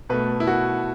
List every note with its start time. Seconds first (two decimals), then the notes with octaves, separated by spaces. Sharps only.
0.09 B2 A3 B4
0.40 E4
0.47 F#4